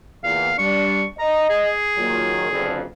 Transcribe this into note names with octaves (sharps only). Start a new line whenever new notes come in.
E2 A#2 F5
G3 D4 C#6
D#5 A#5
G#4
A#2 D#3 F#3
F#1 F2 D3